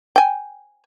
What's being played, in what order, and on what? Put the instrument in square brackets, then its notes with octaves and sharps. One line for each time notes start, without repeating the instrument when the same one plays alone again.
[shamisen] G5 G#5